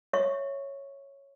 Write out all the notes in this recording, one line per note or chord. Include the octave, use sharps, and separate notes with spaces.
C#5 E5 C#6